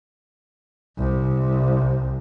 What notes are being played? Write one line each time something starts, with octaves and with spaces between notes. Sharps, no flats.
C2